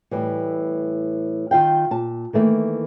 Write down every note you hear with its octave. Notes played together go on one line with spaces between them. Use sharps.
A2 E3 G3
D#3 F4 F5 G5
A#2 A5
D#3 E3 A3 A#3